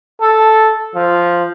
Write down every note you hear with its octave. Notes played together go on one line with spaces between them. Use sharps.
A4
F3